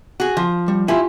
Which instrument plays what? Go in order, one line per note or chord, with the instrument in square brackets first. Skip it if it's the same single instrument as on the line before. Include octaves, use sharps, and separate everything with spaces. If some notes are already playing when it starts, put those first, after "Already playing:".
[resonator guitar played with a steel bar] F#4 G#4
F3
[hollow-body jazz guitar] G3
[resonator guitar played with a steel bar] E4 [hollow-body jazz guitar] F4 G4 G#5